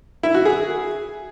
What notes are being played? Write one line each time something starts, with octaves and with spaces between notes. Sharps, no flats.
E4
F#4
G#4